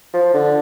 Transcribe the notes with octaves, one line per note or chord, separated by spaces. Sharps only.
F3
D3